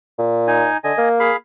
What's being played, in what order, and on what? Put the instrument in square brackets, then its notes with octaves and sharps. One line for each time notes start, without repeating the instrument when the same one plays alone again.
[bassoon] A#2
[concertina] D#4 G#5
[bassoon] D3 [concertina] D#5 G#5
[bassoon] A#3
[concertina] G#4 F5 B5